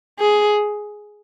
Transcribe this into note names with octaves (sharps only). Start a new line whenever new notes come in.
G#4